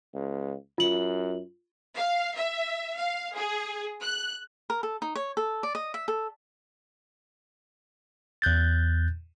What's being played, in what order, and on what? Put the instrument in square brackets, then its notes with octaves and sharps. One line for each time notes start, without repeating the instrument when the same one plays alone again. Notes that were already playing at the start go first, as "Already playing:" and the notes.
[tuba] C#2
[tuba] F#2 [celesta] F4 F#7
[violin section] F5
E5
F5
G#4
F#6
[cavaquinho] A#4
A4
D#4
C#5
A4
D5
D#5
E5
A4
[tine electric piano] E2 F#6 G6 A6